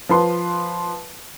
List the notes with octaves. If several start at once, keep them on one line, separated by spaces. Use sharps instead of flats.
F3 B4 C6